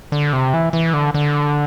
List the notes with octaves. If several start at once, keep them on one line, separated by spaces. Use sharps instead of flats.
D3
C3
E3
E3
D3
D3